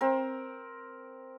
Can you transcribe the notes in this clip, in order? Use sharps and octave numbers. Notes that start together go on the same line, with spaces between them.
C4 A#4